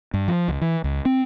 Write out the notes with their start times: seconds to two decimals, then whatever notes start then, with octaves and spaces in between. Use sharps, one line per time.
0.14 G2
0.28 F3
0.48 C#2
0.61 E3
0.84 C#2
1.05 C4